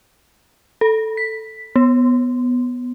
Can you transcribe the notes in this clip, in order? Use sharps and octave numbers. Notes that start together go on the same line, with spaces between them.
A4
B6
B3